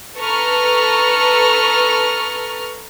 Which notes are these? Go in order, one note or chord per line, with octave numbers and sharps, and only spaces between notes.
A4 B4 A#5 C#6 F6